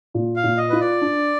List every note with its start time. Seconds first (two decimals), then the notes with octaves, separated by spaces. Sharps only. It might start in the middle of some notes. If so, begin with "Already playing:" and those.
0.14 A#2
0.36 F5
0.44 A#2
0.57 D#5
0.70 F4 B4
0.80 D5
1.01 D4